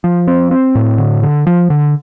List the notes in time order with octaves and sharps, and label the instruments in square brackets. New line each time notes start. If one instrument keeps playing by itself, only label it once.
[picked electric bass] F3
C4
C4
A2
D3
D3
F3
D3